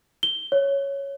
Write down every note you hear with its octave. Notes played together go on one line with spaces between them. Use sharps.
G7
C#5